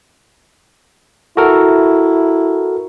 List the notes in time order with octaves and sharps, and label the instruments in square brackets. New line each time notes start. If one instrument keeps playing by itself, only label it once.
[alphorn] E4 [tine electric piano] F#4 A4 A#4